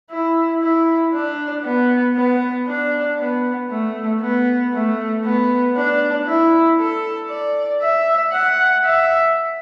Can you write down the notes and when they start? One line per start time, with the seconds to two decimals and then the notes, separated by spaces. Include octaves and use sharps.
0.11 E4
0.62 E4
1.14 D4
1.65 B3
2.16 B3
2.67 D4
3.19 B3
3.71 A3
4.21 B3
4.73 A3
5.24 B3
5.77 D4
6.27 E4
6.79 A4
7.30 D5
7.82 E5
8.32 F#5
8.85 E5